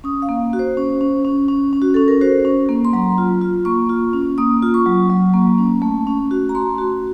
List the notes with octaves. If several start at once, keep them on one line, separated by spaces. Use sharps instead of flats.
C#4 D#6
F5
A#3
F#4
C5
C#4
C#4
C#4
C#4
C#4
F#4
C#4 A4
A#4
F#4 C5
C#4
A#3
C6
F#3 A#5
F4
F4
A#3 C#6
F4
C#4
A#3 D#6
F4
C#6
F#3
F#3
A#3
C#4
A3
C#4
F#4
A#5
A3 C6
F#4